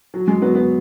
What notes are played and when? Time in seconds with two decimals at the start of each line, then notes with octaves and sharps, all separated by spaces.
0.14 F#3
0.28 G#3
0.42 F#3 B3
0.55 F#3 B3